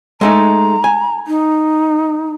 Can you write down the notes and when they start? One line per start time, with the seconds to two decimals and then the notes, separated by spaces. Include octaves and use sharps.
0.21 G#3 A3 D#4 A#5
0.84 G#5
1.27 D#4